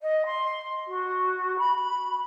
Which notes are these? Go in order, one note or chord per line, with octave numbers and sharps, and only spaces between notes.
D#5
C6
F#4
B5